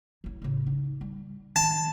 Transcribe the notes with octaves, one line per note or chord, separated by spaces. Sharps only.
F#3 E4
A2 C#3
D#4
G3
D#3 F3 A5